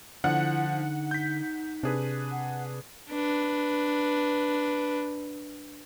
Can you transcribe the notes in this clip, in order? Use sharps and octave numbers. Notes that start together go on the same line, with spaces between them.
D3 F3 E4 F#5
D#4
G6 B6
C3 D4 G#4 B4
F#5
D4 B4